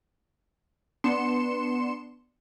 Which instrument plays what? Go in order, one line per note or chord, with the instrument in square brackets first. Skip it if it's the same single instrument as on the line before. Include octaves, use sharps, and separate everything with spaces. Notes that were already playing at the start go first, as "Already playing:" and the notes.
[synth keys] B3 D4 C6 C#7 E7